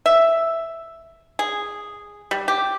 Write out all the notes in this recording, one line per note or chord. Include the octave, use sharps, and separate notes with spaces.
E5
G#4
G3
G4